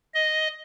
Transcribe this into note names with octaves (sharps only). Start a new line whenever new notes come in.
D#5